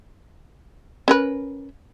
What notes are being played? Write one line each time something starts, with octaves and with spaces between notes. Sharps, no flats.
C#4 A#4 B4